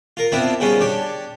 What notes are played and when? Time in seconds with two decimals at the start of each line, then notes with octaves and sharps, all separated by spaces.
0.17 F4 A#4
0.32 B3 C4 D4 E4 F4
0.60 C#3 F3 G3 B3 C#4 F4
0.81 D4 G4 C#5